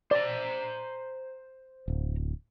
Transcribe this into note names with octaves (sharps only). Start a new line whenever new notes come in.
C5 D5 A#5
D1